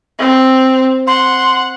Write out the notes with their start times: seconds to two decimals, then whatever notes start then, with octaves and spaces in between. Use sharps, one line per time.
0.19 C4
1.07 F#5 C6